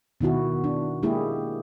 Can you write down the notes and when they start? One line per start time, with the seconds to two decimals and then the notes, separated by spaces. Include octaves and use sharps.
0.21 B2 D#3 E4 F#4
0.64 D4
1.03 G#3 A#3 E4 G4 G#4